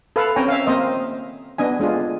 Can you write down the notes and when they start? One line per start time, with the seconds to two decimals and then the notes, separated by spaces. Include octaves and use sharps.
0.16 A4 B4 F5
0.36 C4 C#4 C#5 G5 G#5 A#5
0.48 E5 F5
0.67 A#3 C4 C5 D#5
1.58 B3 D4 D#5 G#5
1.80 G#3 D4 F4 G#4